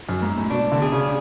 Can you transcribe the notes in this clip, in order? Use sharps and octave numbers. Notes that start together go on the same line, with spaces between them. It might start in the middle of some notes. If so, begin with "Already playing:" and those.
F#2
G#2
A2
B2 D4
D3
G#4
C#3